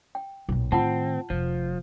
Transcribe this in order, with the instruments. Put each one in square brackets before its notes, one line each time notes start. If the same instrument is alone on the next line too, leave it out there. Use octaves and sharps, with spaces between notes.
[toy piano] G5
[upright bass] B1 A#2
[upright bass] A2 D#3 [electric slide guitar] C4 [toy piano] F4 F#5 A5
[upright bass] F1 [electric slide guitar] F3